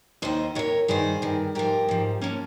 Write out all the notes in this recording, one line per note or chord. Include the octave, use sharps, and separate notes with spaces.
D#2 D#3 C5 D#5
D#2 D#3 A#4 C#5
G2 D#3 G#4 C5
G2 D#3
G#2 F3 G4 A#4
G#2 F3
F3 A#3 C#4